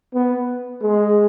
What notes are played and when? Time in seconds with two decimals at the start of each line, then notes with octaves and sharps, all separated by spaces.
0.14 B3
0.82 G#3